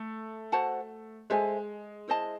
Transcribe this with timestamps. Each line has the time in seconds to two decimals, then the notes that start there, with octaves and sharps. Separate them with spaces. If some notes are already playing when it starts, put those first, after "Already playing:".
Already playing: A3
0.52 F#4 C5 F#5 A5
1.30 G#3 A4 C5 E5 G#5
2.08 E4 C5 D#5 A5